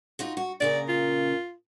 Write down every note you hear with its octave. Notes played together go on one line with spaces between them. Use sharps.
D#4 F4 F#4
F#4
A#2 C#3 A#4 D5
F4